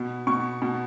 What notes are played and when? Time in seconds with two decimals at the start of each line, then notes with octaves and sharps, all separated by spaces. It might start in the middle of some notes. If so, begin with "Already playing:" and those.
Already playing: B2
0.27 B2 C#6
0.62 B2